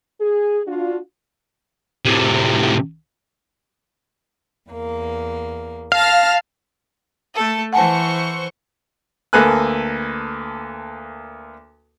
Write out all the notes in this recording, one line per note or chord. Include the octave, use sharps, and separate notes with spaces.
G#4
D4 F4 F#4
A2 C3
E2 A#3
F5 A5 F6 A#6
A3 A4
E3 C5 F#5 G#5 A5 C#6
D2 A#3 A4 B4 G#5 F#6